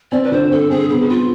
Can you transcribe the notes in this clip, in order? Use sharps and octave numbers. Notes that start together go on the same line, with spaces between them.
C4 D5
B4
D3 C5
C4 A4
C4 G#4
B3 G#4
B3 F4